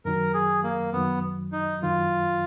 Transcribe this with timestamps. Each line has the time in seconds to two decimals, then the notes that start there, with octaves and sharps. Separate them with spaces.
0.05 F#2 D#3 F#3 A#4
0.34 G#4
0.64 A#3
0.93 F#2 D#3 F#3 B3
1.52 D#4
1.82 F#2 D#3 F#3 F4